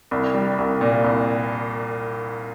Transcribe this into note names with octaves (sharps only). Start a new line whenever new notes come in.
C2
G3
C2
A#2
C2